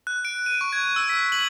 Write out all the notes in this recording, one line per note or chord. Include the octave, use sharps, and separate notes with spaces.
F#6
D7
D#7
C#6
G#6
E6
B6
F#7